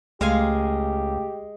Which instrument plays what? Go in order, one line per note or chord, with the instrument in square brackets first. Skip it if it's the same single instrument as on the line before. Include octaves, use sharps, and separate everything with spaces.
[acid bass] C#2 [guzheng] G#3 F5 G#5 [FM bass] A3 [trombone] G4